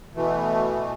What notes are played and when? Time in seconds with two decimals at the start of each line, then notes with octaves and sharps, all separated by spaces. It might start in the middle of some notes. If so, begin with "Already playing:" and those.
0.15 B2 E3 A3